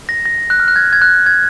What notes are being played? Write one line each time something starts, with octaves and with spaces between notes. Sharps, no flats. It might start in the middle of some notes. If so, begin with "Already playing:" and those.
A#6
A#6
F#6
F6
F#6
G#6
G#6
F#6
G#6